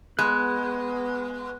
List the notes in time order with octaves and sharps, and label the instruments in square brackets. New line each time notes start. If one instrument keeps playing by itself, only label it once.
[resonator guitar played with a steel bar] G#3 [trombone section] B3 [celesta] B5 C6 [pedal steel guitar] F#6